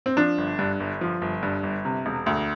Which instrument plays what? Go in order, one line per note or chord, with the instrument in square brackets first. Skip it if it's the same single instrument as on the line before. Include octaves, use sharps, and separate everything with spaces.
[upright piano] C4
F3 D4
G1
G2
G1
F3
G1
G2
G1
C3
E1
D2